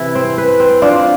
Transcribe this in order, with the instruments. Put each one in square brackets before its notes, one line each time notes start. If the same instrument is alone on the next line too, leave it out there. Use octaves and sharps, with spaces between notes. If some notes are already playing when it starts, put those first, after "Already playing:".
Already playing: [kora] C3 E3 E4
C4
B4
C4
[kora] D4 [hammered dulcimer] F4